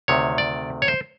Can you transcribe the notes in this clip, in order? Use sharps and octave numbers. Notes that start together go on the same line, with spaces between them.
D2 C3 D#3 C#5
D5
C#5
C5